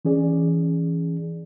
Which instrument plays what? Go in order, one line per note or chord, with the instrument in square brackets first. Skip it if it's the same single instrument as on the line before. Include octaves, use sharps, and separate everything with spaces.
[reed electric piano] E3 C#4 G#4 D5